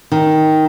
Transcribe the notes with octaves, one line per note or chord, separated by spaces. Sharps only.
D#3